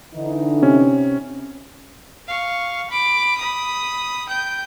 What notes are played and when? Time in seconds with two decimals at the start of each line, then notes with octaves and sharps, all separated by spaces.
0.14 D3 E3 D#4
0.62 C3 C#4
2.28 F5 C#6
2.90 B5 D6
3.37 B5 D#6
4.28 G5 G6